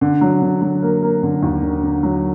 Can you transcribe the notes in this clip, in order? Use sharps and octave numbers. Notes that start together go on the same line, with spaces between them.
D3
F#3
D3
F#3
A#3
A#3
D3
D#2
D3
D3
F#3